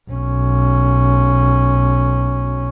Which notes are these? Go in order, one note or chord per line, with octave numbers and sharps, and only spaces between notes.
B1 C#4